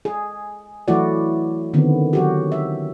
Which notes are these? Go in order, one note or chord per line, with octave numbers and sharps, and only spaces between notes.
G#4
E3 F#3 A3 E4 F#4 D5
D3 D#3 B3 C4
F#3 F#4 G4
E5